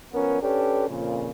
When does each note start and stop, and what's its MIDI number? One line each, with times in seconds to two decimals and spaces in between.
0.13 0.40 53
0.13 0.40 59
0.13 0.40 61
0.13 0.40 70
0.42 0.87 61
0.42 0.87 62
0.42 0.87 67
0.42 0.87 69
0.42 0.87 71
0.42 0.87 73
0.88 1.29 41
0.88 1.29 46
0.88 1.29 49